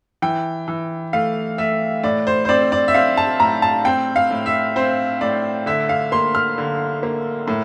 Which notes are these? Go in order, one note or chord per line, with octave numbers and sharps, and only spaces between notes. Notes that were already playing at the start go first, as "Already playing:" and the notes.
E3 G5
E3
A3 F5
A3 E5
A2 D5
C5
C5
C4 D5
D5
E5
C4 F5
A5
A2 A#5
A5
C4 G5
F5
A2
E5
C4 C5
A2 D5
D3 E5
F5
A#3 C6
F6
D3
A#3
A2